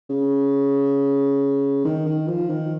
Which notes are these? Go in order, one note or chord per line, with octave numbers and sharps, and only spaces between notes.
C#3
D#3
D#3
F3
D#3